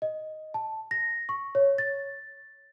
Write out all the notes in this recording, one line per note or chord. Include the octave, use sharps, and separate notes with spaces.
D#5
A5
A#6
C#6
C#5
A6